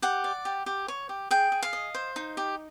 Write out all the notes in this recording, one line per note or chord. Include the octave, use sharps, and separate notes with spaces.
G4 F#5
D5
G4
G4
C#5
G4
G#4 G5
G#4
F5
D#5
C5
D#4
G4